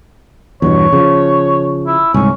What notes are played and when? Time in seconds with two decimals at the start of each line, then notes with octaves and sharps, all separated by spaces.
0.62 E2 G2 B2 C#5
0.93 C#3 F3
1.87 E4
2.14 C2 G#2 C#4